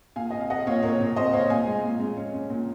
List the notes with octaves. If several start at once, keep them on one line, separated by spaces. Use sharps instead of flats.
A#2 F5 G#5
C4 D#5
F5
C4 D#5 F#5
A#2 C#5 F5
A#2 A#4 C#5
A#2
C4 C5 D#5
C4 C#5 F5
A#2 F5 G#5
G#3
A#2
G#3
C#4
C#4
A#2